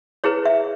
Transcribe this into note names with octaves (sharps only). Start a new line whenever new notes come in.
E4 G#4 B4 C#5
E5